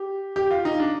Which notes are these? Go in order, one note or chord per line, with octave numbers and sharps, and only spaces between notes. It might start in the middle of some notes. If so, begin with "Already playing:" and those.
Already playing: G4
G4
F4
D#4
D4